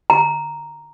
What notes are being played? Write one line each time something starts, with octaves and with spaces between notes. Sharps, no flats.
A#5